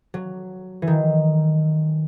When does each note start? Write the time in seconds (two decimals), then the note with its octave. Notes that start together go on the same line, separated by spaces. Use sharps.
0.14 F#3
0.82 E3
0.87 D#3